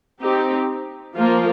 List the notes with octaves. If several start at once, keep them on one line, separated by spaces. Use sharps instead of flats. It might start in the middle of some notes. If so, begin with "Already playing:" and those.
C4 D#4 G4
F3 A#3 F4